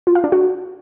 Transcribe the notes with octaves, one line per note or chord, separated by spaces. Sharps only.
F4
F5
D4
F#4